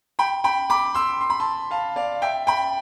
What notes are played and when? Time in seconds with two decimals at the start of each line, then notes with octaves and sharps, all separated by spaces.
0.19 G5 B5
0.44 G5 B5
0.70 B5 D6
0.94 C6 E6
1.21 C6
1.30 B5
1.40 A5 C6
1.71 F5 A5
1.96 D5 F5
2.22 E5 G5
2.47 G5 B5